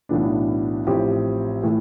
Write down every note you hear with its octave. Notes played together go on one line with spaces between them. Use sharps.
B1 A2 E3 B3 D4
A1 A2 F3 C4 G4
A2 E3 A3